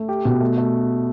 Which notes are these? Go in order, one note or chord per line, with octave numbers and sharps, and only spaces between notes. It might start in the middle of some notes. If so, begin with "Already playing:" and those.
Already playing: A3
G4
B2
A3
A3